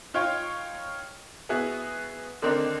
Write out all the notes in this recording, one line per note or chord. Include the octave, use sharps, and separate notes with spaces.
D#4 F4 C#5 F5 G5
B3 E4 F#4 G#4
D3 D#3 A#3 C4 D4 D#4